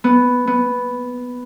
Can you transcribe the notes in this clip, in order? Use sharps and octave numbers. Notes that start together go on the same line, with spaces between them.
B3
B3